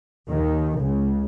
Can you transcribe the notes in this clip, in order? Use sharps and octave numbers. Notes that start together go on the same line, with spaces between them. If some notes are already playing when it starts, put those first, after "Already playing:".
D#2 D#3
C#2 C#3